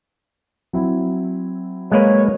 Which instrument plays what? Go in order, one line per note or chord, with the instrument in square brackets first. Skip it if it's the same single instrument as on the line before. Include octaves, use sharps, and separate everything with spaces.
[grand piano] F#3 C4 E4
[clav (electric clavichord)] G#3 A#3 B4 [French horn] C#5